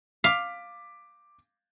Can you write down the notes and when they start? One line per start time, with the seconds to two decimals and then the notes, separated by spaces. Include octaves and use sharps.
0.24 F5 D6 B6